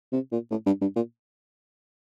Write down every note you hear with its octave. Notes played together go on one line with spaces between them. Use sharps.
C3
A#2
A2
G2
G2
A#2